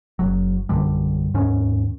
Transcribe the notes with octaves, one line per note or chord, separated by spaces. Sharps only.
F#1 F#3
A#1 F#2 D3 G3
D#2 G#2 D#3 C#4